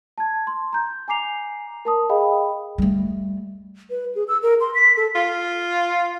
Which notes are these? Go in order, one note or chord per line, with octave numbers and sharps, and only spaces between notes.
A5 G#6
C6
A#5 G6
G#5 A#5 D6 C7 F7
A#4 A5 D#6
G#4 D#5 F5 G5 B5
G3 A3
B4
G#4
E6
A#4
C6
B6
A4
F4